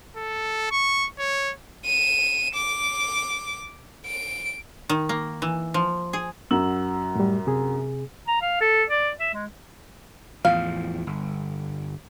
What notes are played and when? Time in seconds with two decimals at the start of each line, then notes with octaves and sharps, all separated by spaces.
0.17 A4
0.71 C#6
1.19 C#5
1.86 D#7 E7
2.55 D6
4.06 D7
4.89 D#3
5.09 A#3
5.42 E3
5.74 F3
6.13 G#4
6.51 F#2 F#4 E6 F#7
7.15 A2 G3
7.47 C3 G#4
8.28 A#5
8.42 F5
8.61 A4
8.89 D5
9.20 E5
9.34 G#3
10.45 E2 A2 F3 F5
11.07 G1